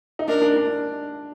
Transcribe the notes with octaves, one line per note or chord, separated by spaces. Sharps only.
D#4
D4 A#4
D4
D4